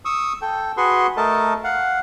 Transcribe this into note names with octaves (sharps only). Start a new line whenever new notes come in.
C#6 D#6 E6
A4 G5
F#4 G#4 B4 C6 C#6
A3 A4 A#4 D#5 A5
F5 F#5